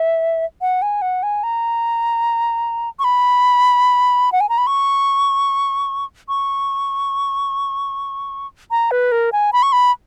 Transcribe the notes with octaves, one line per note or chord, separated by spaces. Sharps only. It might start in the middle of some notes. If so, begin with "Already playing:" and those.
Already playing: E5
F#5
G#5
F#5
G#5
A#5
C#6
B5
F#5
G#5
A#5
B5
C#6
C#6
A#5
B4
A#4
G#5
B5
C#6
B5